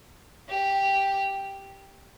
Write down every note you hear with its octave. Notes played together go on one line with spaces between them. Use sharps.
G4